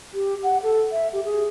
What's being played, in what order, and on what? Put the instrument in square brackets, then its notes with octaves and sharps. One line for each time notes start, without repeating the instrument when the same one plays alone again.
[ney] G4
F#5
A4
E5
G4
G#4